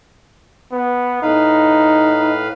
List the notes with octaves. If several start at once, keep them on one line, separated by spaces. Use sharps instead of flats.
B3
A2 D#4 B4 F5